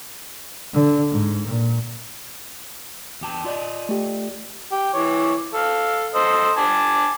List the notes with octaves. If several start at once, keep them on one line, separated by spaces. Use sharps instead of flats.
D3
G#2
A#2
E2 G4 A5
F4 D5 D#5
A3 G4
G4
E3 C#5 D6
A4 F5
A4 C5 D#5
G#5 A5 D6